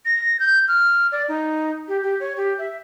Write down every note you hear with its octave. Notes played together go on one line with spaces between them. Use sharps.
A#6
G6
F6
D5
D#4
G4
G4
C#5
G4
E5